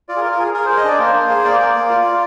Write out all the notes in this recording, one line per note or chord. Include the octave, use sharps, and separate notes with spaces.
F4 D5
G#4
A#4
F4
A#4
G#4
G#4 A#4
G#4 C5
D#5
D4 D5
A#3 C5
A#3
G#4
A#3 D5
A#3
A#3
F4
F4